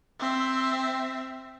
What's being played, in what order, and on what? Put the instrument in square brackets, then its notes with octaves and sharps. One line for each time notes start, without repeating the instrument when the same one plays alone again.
[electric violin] C4 E5